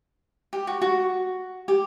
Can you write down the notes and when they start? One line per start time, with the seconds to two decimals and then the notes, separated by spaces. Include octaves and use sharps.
0.53 G4
0.67 F#4
0.82 F#4
1.68 G4